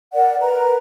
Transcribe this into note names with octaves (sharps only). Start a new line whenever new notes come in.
A#4 D5 F#5
A#4 B4 A#5